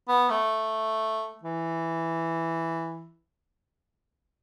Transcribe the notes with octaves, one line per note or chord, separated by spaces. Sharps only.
B3
A3
E3